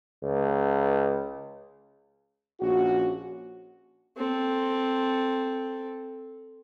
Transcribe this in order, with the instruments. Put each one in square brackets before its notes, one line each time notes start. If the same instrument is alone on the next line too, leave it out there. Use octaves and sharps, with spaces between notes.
[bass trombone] C#2
[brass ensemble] A#1 C#4 F#4
[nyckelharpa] C4 A4